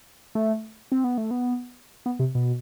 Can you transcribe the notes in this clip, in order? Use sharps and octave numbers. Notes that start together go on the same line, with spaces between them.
A3
C4
B3
A3
B3
B3
C3
B2